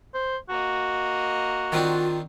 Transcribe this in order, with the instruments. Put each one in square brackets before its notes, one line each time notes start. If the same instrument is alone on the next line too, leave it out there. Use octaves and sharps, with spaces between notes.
[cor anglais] C5
[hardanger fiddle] A#3 D#5 [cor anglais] F#4
[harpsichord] D#3 C4 D4 [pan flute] F4